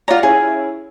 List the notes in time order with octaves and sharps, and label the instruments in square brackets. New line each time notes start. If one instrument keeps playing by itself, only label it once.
[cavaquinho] F4 A#5 [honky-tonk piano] C#5 D5 F#5
[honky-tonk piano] C#4 E4 [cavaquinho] G#4